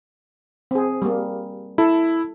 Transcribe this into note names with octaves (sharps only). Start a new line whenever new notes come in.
C4 G#4
G3 A#3
E4 A4